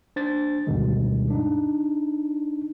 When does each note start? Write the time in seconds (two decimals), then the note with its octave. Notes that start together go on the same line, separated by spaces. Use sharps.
0.16 D4 C5 A6
0.67 D2 G2 B2 D#3 G3 G#3
1.30 D4 D#4